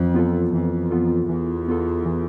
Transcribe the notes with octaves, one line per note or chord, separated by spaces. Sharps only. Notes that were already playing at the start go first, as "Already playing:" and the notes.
Already playing: F2 E3
B3 F4 A4
F2 E3
B3 F4 A4
E2 E3
B3 F4 A4
E3